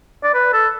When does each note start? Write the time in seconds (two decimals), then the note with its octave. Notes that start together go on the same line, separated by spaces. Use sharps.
0.23 D5
0.34 B4
0.53 A4